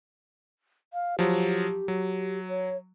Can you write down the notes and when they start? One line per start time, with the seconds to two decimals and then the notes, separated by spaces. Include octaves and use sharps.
0.93 F5
1.19 F3 F#3 G4
1.88 F#3
2.49 C#5